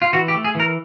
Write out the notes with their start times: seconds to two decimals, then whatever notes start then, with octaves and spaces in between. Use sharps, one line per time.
0.02 F4
0.13 E3 F#4
0.28 G4
0.34 A3
0.44 G#4
0.55 E3 A#4